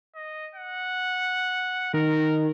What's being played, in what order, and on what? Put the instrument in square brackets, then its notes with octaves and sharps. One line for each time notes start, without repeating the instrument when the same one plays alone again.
[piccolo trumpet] D#5
F#5
[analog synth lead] D#3 [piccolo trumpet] A#4